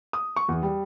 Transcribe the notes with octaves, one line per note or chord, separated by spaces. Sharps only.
D#6
C#6
E2
G3